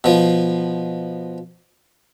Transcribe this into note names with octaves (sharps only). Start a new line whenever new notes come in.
B2 F3